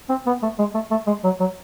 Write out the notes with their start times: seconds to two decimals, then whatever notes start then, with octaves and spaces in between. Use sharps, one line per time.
0.09 C4
0.26 B3
0.43 A3
0.59 G#3
0.74 A3
0.91 A3
1.07 G#3
1.24 F#3
1.40 F#3